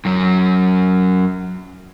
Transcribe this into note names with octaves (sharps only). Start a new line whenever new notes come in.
F#2 F#3